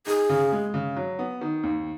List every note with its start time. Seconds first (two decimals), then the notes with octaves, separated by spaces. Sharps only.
0.07 D#4 G#4
0.29 C#3
0.52 G#3
0.74 C#3
0.97 F#3
1.19 B3
1.41 D#3
1.63 D#2